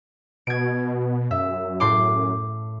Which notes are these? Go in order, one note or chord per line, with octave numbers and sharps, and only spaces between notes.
B2 G#6 D7
F#2 E5
A2 C6 D6